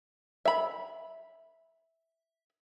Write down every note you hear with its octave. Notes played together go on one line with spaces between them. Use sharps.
E5 B5